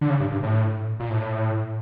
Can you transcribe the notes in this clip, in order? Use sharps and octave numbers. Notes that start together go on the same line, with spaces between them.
D3
C#3
G2
G2
A2
A#2
A2